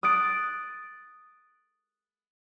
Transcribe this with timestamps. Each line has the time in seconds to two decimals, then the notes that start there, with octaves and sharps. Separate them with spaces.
0.03 D#6 F#6 A6 D7